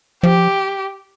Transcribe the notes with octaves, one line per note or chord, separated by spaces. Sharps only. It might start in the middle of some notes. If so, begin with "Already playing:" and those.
F3 G4